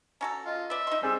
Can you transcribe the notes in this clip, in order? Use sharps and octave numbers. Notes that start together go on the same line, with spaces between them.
C#4 F#4 A4 A#5
F4 D#5
B4 D5 E5
D#4 D#5 C6
G3 C4 G#4 C5 E6